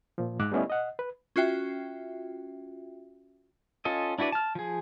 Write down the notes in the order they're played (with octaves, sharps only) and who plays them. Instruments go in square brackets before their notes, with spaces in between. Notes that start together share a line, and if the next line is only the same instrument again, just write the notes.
[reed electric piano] A#2 F3
G#2 D6 F#6
G3 A3 B3 C#4 E4 D#5
D#5 F#5
B4
[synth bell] C#4 F4 F#4 E5 G5
[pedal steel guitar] C#4 F4 A4 D#5
D4 E4 F#4 B4 D5
A5 F6
F3 G#4